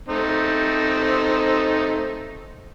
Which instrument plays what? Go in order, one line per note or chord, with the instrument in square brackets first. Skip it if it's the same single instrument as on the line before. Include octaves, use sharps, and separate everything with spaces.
[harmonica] A3 C4 D#4